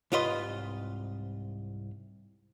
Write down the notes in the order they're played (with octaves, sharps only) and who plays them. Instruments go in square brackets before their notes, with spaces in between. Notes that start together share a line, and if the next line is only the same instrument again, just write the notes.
[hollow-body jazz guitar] C2 G#2 F4 B4 D#5 C6